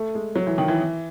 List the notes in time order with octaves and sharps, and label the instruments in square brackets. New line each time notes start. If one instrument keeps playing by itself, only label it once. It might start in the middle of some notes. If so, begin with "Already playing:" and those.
Already playing: [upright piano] A3
G#3
F#3
E3
D#3
E3